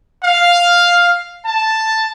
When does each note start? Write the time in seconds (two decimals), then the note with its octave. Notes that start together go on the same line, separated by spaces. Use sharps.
0.24 F5
1.45 A5